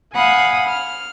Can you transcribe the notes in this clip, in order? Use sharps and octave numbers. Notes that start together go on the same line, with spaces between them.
F5 F#5 G#5 B5 D#6
F6